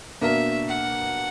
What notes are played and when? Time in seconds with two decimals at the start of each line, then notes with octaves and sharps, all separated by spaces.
0.21 B2 A#3 D4 F#4 A#4 E5
0.68 F#5